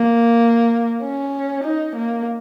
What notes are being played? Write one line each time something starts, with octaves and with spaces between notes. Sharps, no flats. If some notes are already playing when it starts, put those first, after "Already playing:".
Already playing: A#3
C#4
D#4
A#3